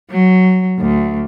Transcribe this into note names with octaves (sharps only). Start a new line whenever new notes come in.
F#3
D2